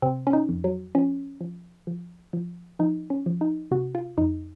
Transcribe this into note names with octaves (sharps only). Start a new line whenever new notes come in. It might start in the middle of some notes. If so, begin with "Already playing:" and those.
C3 C4
C#4
D#4
F2
F#3
F3 C#4
F3
F3
F3
F3 D#4
C#4
F3
D#4
C3 F#4
F4
F2 D#4